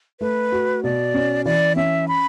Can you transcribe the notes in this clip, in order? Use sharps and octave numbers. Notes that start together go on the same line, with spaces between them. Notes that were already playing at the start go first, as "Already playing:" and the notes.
A3 B4
F#4
B2 D5
C#4
E3 D5
C#4 E5
B5